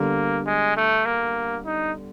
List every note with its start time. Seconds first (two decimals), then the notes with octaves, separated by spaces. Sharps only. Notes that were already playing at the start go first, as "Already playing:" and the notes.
Already playing: D3 G3 A#3 B3
0.47 G#3
0.77 A3
1.05 A#3
1.65 D#4